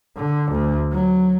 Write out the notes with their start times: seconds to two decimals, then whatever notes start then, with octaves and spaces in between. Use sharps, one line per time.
0.17 D3
0.52 D2
0.93 F#3